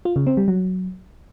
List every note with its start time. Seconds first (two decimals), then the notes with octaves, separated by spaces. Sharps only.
0.05 F4
0.16 C#3
0.27 C4
0.37 G3
0.48 F#3